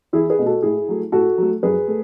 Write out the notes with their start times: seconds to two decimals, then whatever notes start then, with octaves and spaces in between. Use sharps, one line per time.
0.13 E2 E4 G#4
0.30 G#4 B4
0.39 B2 A3
0.46 F#4 A4
0.62 A2 E4 G#4
0.88 F#3 A3
1.12 A2 F#4 A4
1.38 F#3 A3
1.63 F#2 G#4 B4
1.88 A3